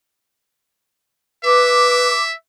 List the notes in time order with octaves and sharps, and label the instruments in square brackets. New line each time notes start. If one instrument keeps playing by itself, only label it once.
[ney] B4 [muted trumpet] E5 [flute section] D6